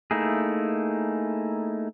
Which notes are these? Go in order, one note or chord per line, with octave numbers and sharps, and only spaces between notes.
A3 A#3 D#4 E4 G#4